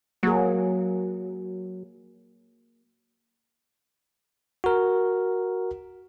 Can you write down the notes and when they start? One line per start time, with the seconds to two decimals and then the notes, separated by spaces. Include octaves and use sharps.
0.23 F#3 A#3 G#4
4.64 F#4 A#4